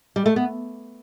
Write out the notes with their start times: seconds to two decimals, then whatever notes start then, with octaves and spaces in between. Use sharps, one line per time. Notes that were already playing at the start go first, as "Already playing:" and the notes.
0.16 G3
0.26 A3
0.36 B3